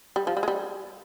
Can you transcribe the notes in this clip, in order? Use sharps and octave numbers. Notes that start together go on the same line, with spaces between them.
G3
F3
G3
G#3
G3